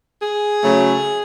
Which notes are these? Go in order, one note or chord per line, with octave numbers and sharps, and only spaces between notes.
G#4
C#3 F#3 A3